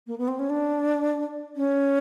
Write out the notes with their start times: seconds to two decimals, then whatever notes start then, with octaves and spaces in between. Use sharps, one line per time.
0.07 A#3
0.18 B3
0.28 C4
0.39 C#4
0.50 D4
1.56 C#4